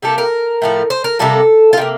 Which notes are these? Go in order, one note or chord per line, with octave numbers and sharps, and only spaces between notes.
C3 G3 A#3 A4
A#4
A2 F3 A3
C5
A#4
C3 G3 A#3 A4
F4
C3 G3 A#3 G4